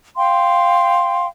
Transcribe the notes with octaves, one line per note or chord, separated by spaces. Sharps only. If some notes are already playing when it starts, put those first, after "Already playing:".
F5 G5 C6